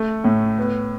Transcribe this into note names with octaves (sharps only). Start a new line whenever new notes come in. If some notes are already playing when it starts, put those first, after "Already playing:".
Already playing: A3
A2
B3